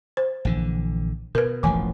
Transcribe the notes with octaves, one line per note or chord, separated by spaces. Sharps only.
C5
A#1 D3 E3
B2 A#4 B4
E1 A1 E3 F3 G#5